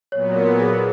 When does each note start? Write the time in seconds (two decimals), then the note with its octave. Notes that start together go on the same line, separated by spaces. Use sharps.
0.12 A#2 F#3 B3 C#5
0.36 A#4
0.60 G#4